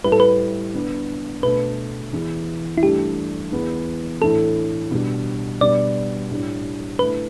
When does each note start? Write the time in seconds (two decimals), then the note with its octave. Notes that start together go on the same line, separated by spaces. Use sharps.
0.04 A2 G3 E4 B4
0.12 A4
0.20 B4
0.74 D3 B3 D4
1.43 B2 A3 D4 B4
2.13 E2 E3 B3
2.78 E4
2.82 G2 E3 A3 D4 G4
3.52 E2 E3 B3
4.21 A2 E3 A3 D4 A4
4.91 B2 G3 D4
5.61 B2 G3 B3 D4 D5
6.31 A2 G3 D4
6.99 D3 A3 E4 B4